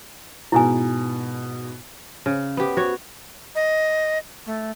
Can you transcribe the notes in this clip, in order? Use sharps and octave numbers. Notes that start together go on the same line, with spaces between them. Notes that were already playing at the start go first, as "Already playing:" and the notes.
G#2 B2 G#3 E4 G#5
C#3
B3 G4
F#4 C#5
D#5
A3